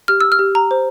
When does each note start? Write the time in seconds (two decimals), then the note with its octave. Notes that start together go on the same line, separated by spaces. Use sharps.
0.08 G4 F6
0.21 E6
0.32 F6
0.39 G4
0.55 A#5
0.71 C5